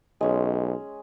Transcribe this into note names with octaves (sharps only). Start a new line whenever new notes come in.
B1 G#3 C#4